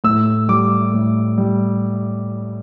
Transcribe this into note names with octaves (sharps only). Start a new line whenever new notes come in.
A2 E6
G3 D6
A2
G3